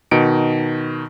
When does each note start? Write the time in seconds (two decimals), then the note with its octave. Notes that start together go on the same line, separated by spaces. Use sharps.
0.11 B2 D#3 D#4 C#7 D7